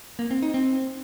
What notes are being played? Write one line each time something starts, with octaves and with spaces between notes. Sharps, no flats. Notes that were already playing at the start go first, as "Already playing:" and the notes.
A#3
C4
D#4
C4